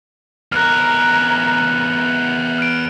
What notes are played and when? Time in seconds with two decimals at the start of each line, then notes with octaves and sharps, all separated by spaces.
0.52 E2 A#4 F6 F#6
2.58 F6 D7